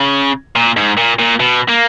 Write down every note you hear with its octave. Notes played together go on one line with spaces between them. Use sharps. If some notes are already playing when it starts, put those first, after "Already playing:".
Already playing: C#3
A#2
G#2
A#2
A#2
B2
A#3